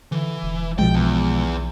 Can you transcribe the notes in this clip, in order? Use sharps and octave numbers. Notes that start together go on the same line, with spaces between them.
D3 E3
E1
B1 B2 F3 G#3 G5
E2